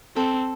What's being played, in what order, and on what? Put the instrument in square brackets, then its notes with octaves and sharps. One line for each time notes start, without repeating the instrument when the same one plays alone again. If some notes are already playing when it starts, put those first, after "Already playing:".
[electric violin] C4 [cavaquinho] A4